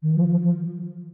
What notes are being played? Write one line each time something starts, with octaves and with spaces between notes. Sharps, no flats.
D#3
F3
F3
F3